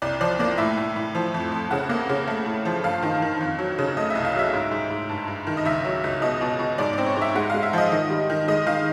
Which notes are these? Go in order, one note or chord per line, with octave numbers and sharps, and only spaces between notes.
C2 D5
F3 D5
A#3 D5
A2 E5
A2
A2
F3
F2
F2
C#3 F#5
A#3
C#3
A3
A2
F3
G2 F5
D#3
D#3
F2
F#3
C#3
A3 D#5
E5
C2
F5
F#3 E5
G#2
G#2
G#2
G2
G2
D#3
D#5
C#2 E5
F#3
C#2
B2 D#5
B2
B2
G#2 D5
C4 D5
C#5
G#2
E5
G#3 F#5
G#3 F5
E5
F3 D#5
D#3 D#5
G3
D#3
G#3 D#5
D#3 F5